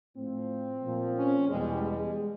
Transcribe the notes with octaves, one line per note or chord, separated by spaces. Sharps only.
A2 F3 C4
A#2 F3
C#4
E2 B2 G3 G#3
G#3